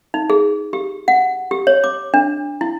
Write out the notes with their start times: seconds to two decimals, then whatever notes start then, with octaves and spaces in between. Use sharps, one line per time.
0.14 D#4
0.30 G#4
0.73 G4
1.08 F#5
1.51 G4
1.67 C#5
1.84 D6
2.14 D4
2.61 E4